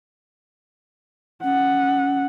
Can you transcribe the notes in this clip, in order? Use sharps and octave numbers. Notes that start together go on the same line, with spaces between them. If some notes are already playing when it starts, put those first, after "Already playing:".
C#4 F#5